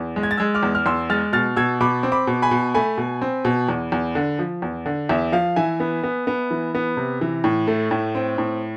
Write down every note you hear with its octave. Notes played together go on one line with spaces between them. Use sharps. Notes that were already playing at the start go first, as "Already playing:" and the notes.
Already playing: E2
G#3
G#6
A6
G#3 E6 G#6
D6 F6
E2
F6
E2 C6 E6
G#3 F6 A6
B2 F6 A6
B2 E6 G#6
B2 B5 D6
C4
B5 D6
B2
G#5 B5
B2
A3 G#5 B5
B2
C4
B2
E2
E2
D3
F3
E2
D3
E2 E5
F3 F5
E3 E5 G#5
B3
B3
B3
E3
B3
C3
E3
A2
A3
A2
C4
A2